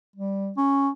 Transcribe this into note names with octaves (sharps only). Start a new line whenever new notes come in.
G3
C#4